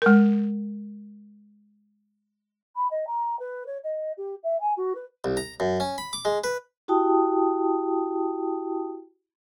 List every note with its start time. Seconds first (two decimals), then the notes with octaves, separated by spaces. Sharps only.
0.02 G#3 A#4
2.76 B5
2.91 D#5
3.07 A#5
3.39 B4
3.66 C#5
3.84 D#5
4.17 G4
4.43 E5
4.60 G#5
4.77 F#4
4.95 B4
5.24 C2
5.37 A#5
5.60 F#2
5.80 C#4
5.98 B5
6.13 D6
6.25 G#3
6.44 B4
6.88 E4 F#4 G4 G5 A5 D#6